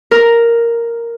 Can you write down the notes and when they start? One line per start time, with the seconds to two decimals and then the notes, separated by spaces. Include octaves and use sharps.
0.11 A#4